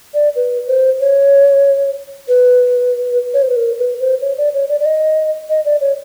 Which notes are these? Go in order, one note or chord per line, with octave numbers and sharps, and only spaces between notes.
D5
B4
C5
C#5
B4
C#5
C5
B4
A#4
B4
C5
C#5
D5
C#5
D5
D5
D#5
D#5
D5
C#5